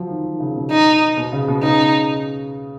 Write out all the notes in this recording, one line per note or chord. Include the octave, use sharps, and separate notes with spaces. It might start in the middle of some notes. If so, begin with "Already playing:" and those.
Already playing: F3 F#3
D#3
D#3
C#3
B2
D#4
B2
C#3
B2
C#3 D#4